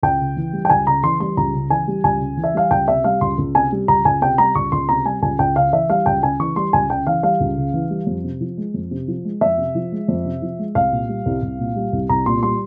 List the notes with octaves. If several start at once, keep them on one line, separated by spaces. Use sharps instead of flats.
C#2 G5
C#3
E3
G3
G5
C#2 G#5
C#3 A#5
E3 C6
G3 C6
C#2 A#5
C#3
E3 G#5
G3
C#2 G#5
C#3
E3
E5
G3 F5
C#2 G5
C3 E5
G3 F5
C#2 C6
C#2
C3 G#5
G3
C#2 A#5
C#2 G#5
C3 G5
G3 A#5
C#2 C#6
C#2 C6
C3 A#5
G3 G#5
C#2 G#5
C#2 G5
C#3 F5
E3 E5
G3 F5
C#2 G5
C#3 G#5
E3 C#6
G3 C6
C#2 G#5
C#3 G5
E3 F5
G3 F5
C#2
C#3
E3
G3
F2
C3
F3
G#3
F2
C3
F3
G#3
F2 E5
C3
F3
G#3
F2
C3
F3
G#3
C2 F5
A#2
G3
C2
C2
A#2
G3
C2
C2 A#5
A#2 C6
G3 C6